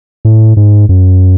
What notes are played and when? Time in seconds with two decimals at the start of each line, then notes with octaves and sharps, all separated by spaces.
0.25 A2
0.57 G#2
0.89 F#2